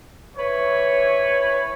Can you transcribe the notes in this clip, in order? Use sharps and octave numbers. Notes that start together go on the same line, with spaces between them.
E3 B4 C#5